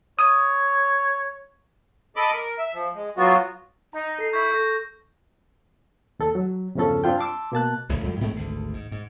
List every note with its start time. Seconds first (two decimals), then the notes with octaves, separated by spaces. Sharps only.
0.19 C#5 D#6
2.16 A4 D#5 B5 D6
2.33 A#4
2.58 E5
2.73 F3
2.95 G#3
3.17 F#3 B3 F4 F#4
3.93 D#4 A#5
4.19 A4 C7
4.33 E4 C#6 G6
4.54 A4 A#6
6.19 D#2 A4
6.35 F#3
6.75 E2 G2 C#3 F3 C#4 A4
7.04 G2 C4 D4 F4 G5
7.18 A5 C6 D6 E6
7.52 B2 A#3 A5 F#6
7.89 A1 D2 G2 C#3
8.04 F2 G3 G#3
8.21 G#2 G#3 A3 C4
8.34 G#1 D2 D3
8.73 G#2
8.92 G#2